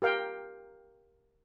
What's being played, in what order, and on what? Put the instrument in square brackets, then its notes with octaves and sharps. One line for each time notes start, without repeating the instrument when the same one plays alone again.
[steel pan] G4 A#4 F5 G5